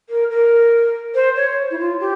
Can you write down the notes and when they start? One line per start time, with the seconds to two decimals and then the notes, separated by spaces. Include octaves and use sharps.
0.09 A#4
0.30 A#4
1.15 C5
1.36 C#5
1.71 E4
1.79 F4
2.00 G4